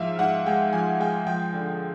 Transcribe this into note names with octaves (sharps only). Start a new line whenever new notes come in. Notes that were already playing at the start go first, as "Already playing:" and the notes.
Already playing: G#2 F3 E5 F5
G#2 F#5
G#3 G5
F3 G#5
G#3 G5
F3 G5
D3